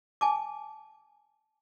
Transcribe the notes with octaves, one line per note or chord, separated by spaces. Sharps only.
G#5 A5 D6